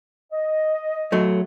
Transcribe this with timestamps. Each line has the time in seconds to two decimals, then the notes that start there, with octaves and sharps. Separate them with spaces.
0.33 D#5
1.12 F#3 A3